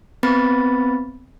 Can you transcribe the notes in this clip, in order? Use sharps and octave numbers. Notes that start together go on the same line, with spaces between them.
B3 C4 B4 B5 A6